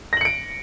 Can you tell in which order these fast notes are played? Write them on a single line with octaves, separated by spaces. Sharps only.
A#6 F#7 C#7 D7